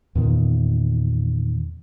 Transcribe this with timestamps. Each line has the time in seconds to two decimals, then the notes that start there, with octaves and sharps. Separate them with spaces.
0.15 E2 A#2 D#3